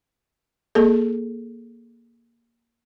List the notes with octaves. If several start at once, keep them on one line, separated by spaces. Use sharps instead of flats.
A#3 G#4 A4